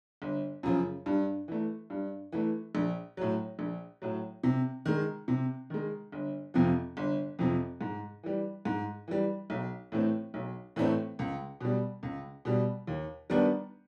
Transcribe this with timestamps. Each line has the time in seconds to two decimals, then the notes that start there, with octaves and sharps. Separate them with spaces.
0.22 G1
0.63 F#2 C#3 F3
1.06 G2
1.48 E3 A3
1.90 G2
2.32 E3 A3
2.75 A#1
3.17 A2 F#3
3.59 A#1
4.02 A2 F#3
4.43 C3
4.86 D#3 G#3
5.28 C3
5.70 D#3 G#3
6.12 G1
6.54 F2 C3 F3
6.97 G1
7.39 F2 C3 F3
7.81 G#2
8.23 E3 G3
8.65 G#2
9.08 E3 G3
9.50 B1
9.92 A2 E3 A3 C4
10.34 B1
10.76 A2 E3 A3 C4
11.19 C#2
11.61 B2 G3
12.03 C#2
12.45 B2 G3
12.87 D#2
13.30 D#3 G3 B3 D4